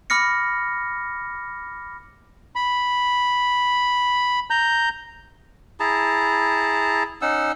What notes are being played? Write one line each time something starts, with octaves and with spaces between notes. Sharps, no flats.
B5 D6 F6 A#6 C#7
B5
A#5 G6
E4 G#4 A5 A#5
C#4 D#4 F#5 E6